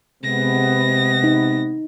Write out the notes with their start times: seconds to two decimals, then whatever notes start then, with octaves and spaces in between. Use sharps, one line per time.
0.24 C3 G#3 B3 A#6
1.24 D#4